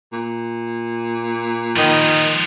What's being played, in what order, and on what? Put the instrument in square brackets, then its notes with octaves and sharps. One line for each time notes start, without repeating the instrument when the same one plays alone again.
[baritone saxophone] A#2
[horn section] D#3 [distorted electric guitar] F3 B4